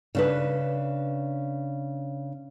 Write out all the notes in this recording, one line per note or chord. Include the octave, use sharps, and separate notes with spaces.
C#3 D4 B4